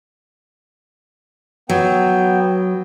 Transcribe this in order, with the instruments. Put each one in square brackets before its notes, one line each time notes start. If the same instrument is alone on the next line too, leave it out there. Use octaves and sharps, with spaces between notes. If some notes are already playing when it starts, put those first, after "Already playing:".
[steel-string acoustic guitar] F#3 [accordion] B3 G5